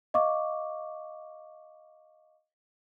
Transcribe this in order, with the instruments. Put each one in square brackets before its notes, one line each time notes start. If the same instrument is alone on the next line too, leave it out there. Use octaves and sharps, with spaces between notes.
[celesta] D#5 F5 C#6 D6